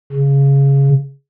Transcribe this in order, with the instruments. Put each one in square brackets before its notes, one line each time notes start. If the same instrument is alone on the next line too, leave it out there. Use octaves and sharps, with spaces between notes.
[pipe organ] C#3